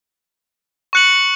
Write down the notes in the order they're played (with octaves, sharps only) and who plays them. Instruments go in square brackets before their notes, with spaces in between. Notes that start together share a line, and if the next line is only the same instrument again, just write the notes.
[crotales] C#6 F#6 C#7 F#7